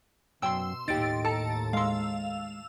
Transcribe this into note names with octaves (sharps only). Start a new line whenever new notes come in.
F#2 B2 F#3 G5 C6 E6
D#2 A2 D#4 G4 A6 D7
A4 A5 A#5
G#3 F5 C6 E6